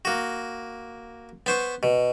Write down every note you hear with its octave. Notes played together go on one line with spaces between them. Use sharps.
A#3 F#4
B3 C5 C#6
B2